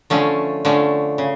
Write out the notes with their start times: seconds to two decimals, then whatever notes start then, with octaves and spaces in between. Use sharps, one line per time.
0.10 D3 F3 A3 C#4
0.65 D3 F3 A3 C#4
1.18 C#3